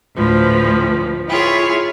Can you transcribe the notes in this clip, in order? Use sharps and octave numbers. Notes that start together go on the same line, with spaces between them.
D2 A2 F3 B4
E4 F4 G#4 C#5